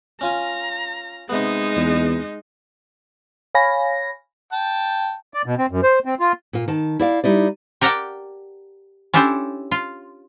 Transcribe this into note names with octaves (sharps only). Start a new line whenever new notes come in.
C#4 F4 G#5 A#5
C3 G#3 B3 D#4
E2
C#5 F5 G#5 B5 A#6
G5 A5
D5
B2
C4
F#2
C5
C4
F4
A#2 F4
D#3 A5
E4 D5 F5
G3 D#4 E4 D5
G4 A#4 D5 F#5 G5 A5
C#4 D4 E4 G4 A4 C5
F4